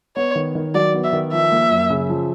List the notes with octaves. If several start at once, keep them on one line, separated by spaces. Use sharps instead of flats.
B3 C#5
D#3
D#3
F#3 D5
B3
E5
D#3
F3 E5
A#3
F#2
C#3
F3